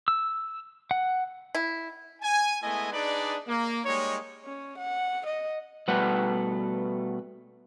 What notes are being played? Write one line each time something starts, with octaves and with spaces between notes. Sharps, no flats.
E6
F#5
E4
G#5
G#3 A3 B3 E4 D#5 G#5
D4 D#4 G#4 B4 D5
A#3
G3 G#3 A#3 D#4 C#5
C#4
F#5
D#5
B2 G3 A3 B4 F#5